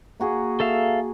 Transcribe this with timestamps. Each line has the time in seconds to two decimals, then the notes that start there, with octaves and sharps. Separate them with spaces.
0.20 A#3 F#4 G#4
0.60 A4 E5 F5